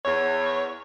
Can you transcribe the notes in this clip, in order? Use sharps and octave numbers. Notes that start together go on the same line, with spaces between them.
E2 C#5